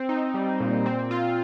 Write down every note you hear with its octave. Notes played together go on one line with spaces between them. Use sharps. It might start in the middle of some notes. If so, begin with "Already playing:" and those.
Already playing: C4
D#4
G3
A#2
C4
F4